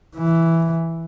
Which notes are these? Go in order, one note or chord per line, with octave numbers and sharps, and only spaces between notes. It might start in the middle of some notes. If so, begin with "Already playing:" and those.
E3